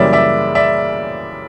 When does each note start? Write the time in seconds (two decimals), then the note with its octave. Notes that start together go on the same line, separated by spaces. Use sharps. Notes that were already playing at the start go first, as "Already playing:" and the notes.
Already playing: F#2 C#3 E3 G3 A#3 D5 E5
0.13 D5 E5
0.55 D5 E5